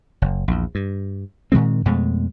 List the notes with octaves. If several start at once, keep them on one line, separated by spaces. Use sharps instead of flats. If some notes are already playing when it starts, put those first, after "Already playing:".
F#1
A#1 E2
G2
A#2 D#3 G#3 C4
F2 B2 G#3 A3